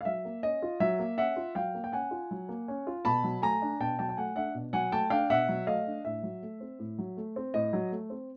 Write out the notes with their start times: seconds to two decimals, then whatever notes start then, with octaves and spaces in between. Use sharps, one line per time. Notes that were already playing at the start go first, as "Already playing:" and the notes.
0.01 F5
0.05 F#3 E5
0.25 A#3
0.43 C#4 D#5
0.62 F4
0.80 F#3 E5
0.99 A#3
1.18 C#4 E5 F#5
1.36 F4
1.55 F#3 F5 G5
1.74 A#3
1.84 G5
1.92 C#4 F#5 G#5
2.11 F4
2.31 F#3
2.49 A#3
2.68 C#4
2.87 F4
3.05 B2 A5 B5
3.24 F#3
3.42 A3 G#5 A#5
3.62 D4
3.80 B2 G5 A5
3.99 F#3 G5 A5
4.09 G5
4.17 A3 F#5 G#5
4.36 D4 E5 F#5
4.55 B2
4.73 F#3 F#5 G#5
4.92 A3 G5 A5
5.10 D4 F5 G5
5.30 B2 E5 F#5
5.49 F#3
5.67 A3 D#5 F5
5.86 D4
6.05 A2 E5
6.23 F#3
6.42 A3
6.60 C4
6.79 A2
6.98 F#3
7.17 A3
7.36 C4
7.54 A2 D#5
7.73 F#3
7.92 A3
8.10 C4